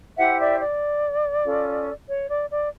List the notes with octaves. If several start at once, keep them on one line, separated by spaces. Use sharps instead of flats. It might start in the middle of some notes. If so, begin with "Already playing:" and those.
E4 G4 C5 E5 F#5
D5 E5
D5
C#4 F4 A4
C#5
D5
D5